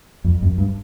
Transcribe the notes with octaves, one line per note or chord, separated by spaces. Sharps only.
F2
F#2
G2